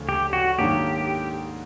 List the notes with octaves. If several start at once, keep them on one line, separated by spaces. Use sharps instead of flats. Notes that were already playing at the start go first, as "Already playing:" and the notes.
Already playing: D2 C#3 F3 A3 C#4
G4
F#4
G#2 D#3 F#3 A#3 D4 G4